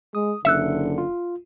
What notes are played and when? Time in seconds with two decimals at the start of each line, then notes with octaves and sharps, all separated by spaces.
0.15 G#3 D#6
0.45 F#1 D3 E5 E6 F#6 C#7
0.98 F4